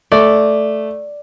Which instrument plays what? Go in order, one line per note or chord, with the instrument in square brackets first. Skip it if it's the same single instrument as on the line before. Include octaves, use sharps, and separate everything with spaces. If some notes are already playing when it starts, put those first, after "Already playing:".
[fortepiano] A3 [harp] D5